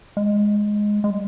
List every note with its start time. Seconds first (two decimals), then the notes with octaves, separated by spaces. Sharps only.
0.17 G#3
1.04 G#3
1.10 G3